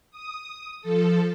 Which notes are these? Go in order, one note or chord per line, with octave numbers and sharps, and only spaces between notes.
D#6
F3 A4